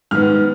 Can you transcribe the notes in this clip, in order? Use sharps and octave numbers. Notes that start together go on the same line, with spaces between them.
G#2 D#3 B3 F6